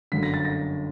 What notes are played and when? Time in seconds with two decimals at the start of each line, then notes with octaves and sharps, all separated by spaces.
0.12 G1 F#2 D3 B6
0.23 A#6
0.34 A6
0.45 A#6